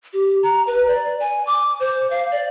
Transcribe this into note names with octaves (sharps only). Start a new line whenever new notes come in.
G4
A#5
B4
D5
G#5
D6
C5
F5
D5